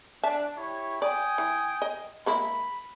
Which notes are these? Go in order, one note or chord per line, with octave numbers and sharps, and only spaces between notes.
D4 E5 A5
E4 G4 C#5
D5 G5 G#5 D#6
E3
D#5
G#3 A#3 E4 B5